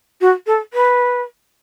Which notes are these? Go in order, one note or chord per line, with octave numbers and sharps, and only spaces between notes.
F#4
A4
B4